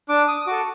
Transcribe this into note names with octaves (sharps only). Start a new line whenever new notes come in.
D4 D6
D#6
F#4 A4 D6